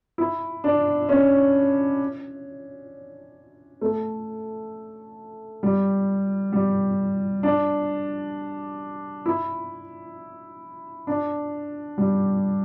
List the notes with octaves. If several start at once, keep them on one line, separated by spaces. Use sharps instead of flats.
E4
D4
C#4
A3
G3
G3
D4
E4
D4
G3